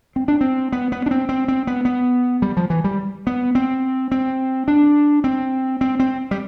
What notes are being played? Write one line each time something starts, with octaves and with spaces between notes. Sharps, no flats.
C4
D4
C4
B3
B3
D4
C4
C4
C4
B3
B3
G3
F3
E3
G3
B3
C4
C4
D4
C4
C4
C4
G3